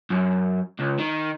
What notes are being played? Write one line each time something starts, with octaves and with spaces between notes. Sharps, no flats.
F#2
C#2
D#3